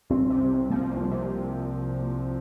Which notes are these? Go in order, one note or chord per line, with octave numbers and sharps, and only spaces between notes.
C2 C4
C3
C2
F3 A#3
C2
C3